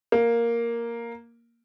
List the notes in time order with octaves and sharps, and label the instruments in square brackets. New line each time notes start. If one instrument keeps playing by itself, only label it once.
[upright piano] A#3